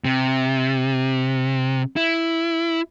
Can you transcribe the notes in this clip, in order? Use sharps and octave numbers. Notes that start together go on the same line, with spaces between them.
C3
E4